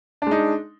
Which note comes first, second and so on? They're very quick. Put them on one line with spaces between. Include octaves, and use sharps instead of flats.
D4 G#3 D#4